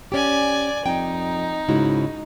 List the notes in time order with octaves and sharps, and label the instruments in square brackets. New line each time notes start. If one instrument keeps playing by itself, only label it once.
[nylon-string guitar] C#4 G4 [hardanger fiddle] D5 G#5
[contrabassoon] F2 [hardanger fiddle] D#4 [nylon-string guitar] G5
[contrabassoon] G#2 [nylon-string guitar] C#3 E4 F#4